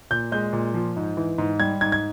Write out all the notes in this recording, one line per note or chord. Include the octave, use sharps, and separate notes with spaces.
A#2 G6
G#3 G6
A#2
F3
G#2
E3
G#2
G3 G#6
G#2 G#6
G#6